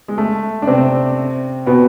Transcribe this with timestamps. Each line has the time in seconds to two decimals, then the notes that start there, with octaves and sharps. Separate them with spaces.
0.08 G#3
0.18 A3
0.62 D4
0.67 C3 C4
1.66 B2 B3